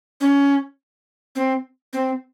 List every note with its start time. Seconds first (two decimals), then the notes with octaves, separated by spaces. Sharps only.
0.21 C#4
1.36 C4
1.93 C4